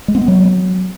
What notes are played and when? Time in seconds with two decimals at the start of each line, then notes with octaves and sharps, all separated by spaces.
0.08 G#3
0.15 C4
0.21 B3
0.28 F#3